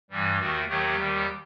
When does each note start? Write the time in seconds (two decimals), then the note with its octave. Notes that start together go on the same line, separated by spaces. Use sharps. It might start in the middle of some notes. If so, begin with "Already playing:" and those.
0.10 G2 E3 G3
0.39 D#2 D#3 A3 F#4
0.68 D#2 D#3 F#3 A3 G4
0.98 D#2 D#3 G3